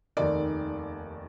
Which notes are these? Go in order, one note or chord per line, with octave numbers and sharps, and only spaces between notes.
F1 D#2 D#3 D5